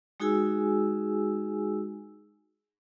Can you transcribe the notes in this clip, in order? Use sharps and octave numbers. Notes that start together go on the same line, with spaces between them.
G#3 D#4 F#4 G#4 G#5 E6